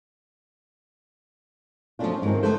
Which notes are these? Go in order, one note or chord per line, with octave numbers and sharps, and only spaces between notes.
F3 F#3 A3 C#4 D4 F4
G#2 D#3 C4
D3 F3 A3 A4 B4 C5